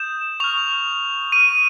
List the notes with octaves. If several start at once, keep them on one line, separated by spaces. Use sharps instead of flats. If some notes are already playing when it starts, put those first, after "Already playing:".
Already playing: D#6 G6 E7
C#6 F6 F7
C#6 F6 D#7